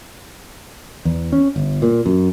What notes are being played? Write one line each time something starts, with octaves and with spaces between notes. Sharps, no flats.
E2
C#4
G1
A#2
F#2